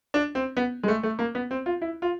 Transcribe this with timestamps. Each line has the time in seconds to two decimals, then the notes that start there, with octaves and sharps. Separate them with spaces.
0.14 D4
0.35 C4
0.57 B3
0.83 G#3
0.88 A3
1.03 A3
1.19 A#3
1.35 B3
1.51 C4
1.66 F4
1.82 E4
2.02 F4